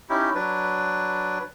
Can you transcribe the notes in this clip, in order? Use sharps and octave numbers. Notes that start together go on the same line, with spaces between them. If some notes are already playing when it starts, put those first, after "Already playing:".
C#4 D#4 E4 G4
F#3 D4 B4